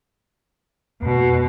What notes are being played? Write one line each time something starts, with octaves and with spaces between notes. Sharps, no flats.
F2 B2